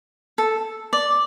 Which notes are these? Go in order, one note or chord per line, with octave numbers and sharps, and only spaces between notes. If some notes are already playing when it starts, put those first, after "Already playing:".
A4
D5